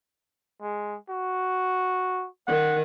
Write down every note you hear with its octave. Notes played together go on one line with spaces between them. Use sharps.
G#3
F#4
D#3 F#5